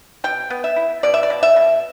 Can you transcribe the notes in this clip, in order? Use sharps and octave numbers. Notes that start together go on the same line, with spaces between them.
B2 G5
B3
E5
E4
B2 D5
E5
D5
B2
E5
B2